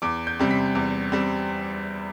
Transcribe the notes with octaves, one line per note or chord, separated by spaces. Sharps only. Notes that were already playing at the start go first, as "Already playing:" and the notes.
E2 D6
G6
C3 G3 C4
B6
E2
G3 C4